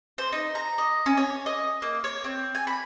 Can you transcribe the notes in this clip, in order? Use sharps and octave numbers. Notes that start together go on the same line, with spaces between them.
C5
D#4
A#5
D#5
C#4
C#5
D#5
A#3
C#5
C4
G#5
B5